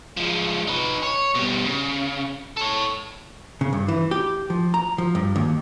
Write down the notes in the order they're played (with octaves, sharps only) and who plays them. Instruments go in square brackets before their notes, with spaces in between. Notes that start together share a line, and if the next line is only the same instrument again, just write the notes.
[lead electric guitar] F3 G#3
D#4 B4
C#5
B2 G3
C#3
A4 C#5
[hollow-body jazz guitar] C#3
G2
E3
G4
F3
A#5
F3
G2
D#2